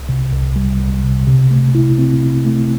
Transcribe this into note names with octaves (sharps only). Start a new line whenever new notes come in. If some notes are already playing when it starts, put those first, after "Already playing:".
Already playing: C2
C3
C2
G3
C2
C3
C3
A3
E4
C4
C3
A3